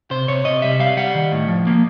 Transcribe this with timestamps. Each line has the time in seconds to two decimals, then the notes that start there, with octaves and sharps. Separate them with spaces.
0.11 C3 C5
0.28 C3 C#5
0.45 C3 D#5
0.62 G3 E5
0.79 G3 F5
0.97 G3 F#5
1.15 D#3
1.32 A2
1.48 F3
1.67 A#3